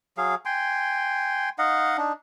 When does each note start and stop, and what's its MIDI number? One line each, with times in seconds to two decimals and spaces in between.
0.17 0.35 54
0.17 0.35 68
0.17 0.35 77
0.45 1.49 79
0.45 1.49 80
0.45 1.49 84
1.59 1.97 63
1.59 1.97 75
1.59 1.97 77
1.59 1.97 78
1.97 2.13 62
1.97 2.13 63